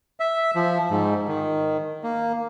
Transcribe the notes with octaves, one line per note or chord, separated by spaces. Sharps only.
E5
F3
G#2
D#3
A#3